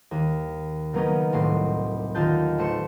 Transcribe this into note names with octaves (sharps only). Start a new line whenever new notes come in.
D#2
C#3 F#3 A#3 B3 C#4 D#4
D#1 C2 A2 C6
D#2 D3 D#4 F4 A5 G6
A1 A3 C5 C#7 E7